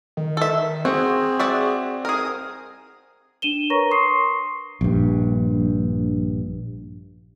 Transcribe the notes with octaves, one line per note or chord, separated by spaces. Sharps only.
D#3
A4 E5
C4 F#4 G#4
F#4 D5 E5
G#4 A#4 D#6
D4 D#7 E7 G7
A#4 B4 C#5 A#5 C#6 A#6
C6 C#6 D#6 C7
A#1 G2